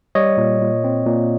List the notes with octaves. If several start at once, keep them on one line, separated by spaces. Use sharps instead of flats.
G3 C#5 D#5
A#2
A#2
C4
A#2